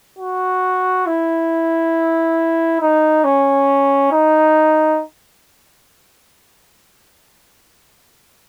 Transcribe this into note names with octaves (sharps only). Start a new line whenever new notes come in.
F#4
E4
D#4
C#4
D#4